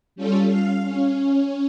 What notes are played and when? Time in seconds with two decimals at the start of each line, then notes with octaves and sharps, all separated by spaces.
0.16 G3 C#4 F4 A4
0.47 F5
0.84 C#4